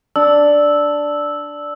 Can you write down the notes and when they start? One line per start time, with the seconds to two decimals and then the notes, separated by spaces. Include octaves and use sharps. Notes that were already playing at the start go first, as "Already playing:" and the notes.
0.16 D4 E6